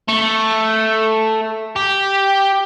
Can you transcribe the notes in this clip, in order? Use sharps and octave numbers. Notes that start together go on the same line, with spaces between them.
A3
G4